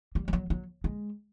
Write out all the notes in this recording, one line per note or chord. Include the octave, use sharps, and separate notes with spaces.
G3
G3
F#3
F#3
G#3